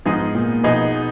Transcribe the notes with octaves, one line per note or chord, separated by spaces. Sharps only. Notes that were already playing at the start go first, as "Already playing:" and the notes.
G#2 F3 B3 D#4 G#4 D#5
A#2
B2 F3 B3 D#4 G#4 D#5